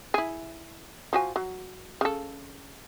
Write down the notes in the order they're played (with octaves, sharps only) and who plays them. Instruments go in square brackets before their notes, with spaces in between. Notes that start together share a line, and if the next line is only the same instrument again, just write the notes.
[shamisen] E4 G#4
F3 F#4 G#5
F#3
C#3 A4